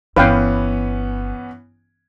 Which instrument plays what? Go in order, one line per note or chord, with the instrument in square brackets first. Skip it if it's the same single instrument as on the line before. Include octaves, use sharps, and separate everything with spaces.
[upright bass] G1 [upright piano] E3 B3 C#4 [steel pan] B4 F5 G5